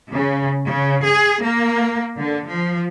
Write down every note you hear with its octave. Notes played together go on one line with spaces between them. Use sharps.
C#3
C#3
G#4
A#3
D3
F3